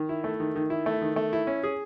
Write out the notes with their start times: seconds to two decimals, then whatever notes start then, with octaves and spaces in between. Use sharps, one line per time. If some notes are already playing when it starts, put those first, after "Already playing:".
Already playing: D#3
0.09 E4
0.24 A3
0.40 D#3
0.56 D#3
0.70 E4
0.86 A3
1.01 D#3
1.16 A3
1.33 E4
1.47 C#4
1.64 G#4